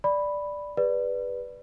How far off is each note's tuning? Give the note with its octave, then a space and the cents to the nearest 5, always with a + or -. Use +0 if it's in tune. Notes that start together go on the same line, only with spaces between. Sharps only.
D5 +0 B5 +0
G#4 -40 B4 +0 D5 +0